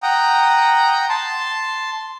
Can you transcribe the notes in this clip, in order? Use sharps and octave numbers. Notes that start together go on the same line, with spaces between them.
F#5 G5 A#5 D#6
A5 C6